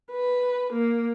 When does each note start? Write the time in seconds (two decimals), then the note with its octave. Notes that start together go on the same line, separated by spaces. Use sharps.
0.12 B4
0.73 A#3